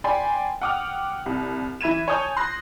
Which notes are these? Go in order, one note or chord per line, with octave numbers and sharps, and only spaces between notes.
D5 G5 G#5 B5 C6
F#5 G5 D6 D#6 F6
C2
E3 E5 B5 G#6 D#7 E7
C#5 G#5 A5 D#6 G6
C6 F#6 A#6